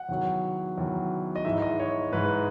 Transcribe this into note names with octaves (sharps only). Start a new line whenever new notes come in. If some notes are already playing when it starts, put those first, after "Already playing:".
Already playing: F#5
E2 D#3 F#3
E2 D#3 F#3
D#5
G#2 E3 G#3 D#4 E5
D#5
C#5
G#2 E3 G#3 D#4 B4